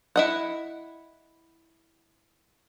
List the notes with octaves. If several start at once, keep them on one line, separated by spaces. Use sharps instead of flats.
E4 D#5 F#5